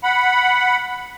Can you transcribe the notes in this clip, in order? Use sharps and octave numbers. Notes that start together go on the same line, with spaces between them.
F#5 B5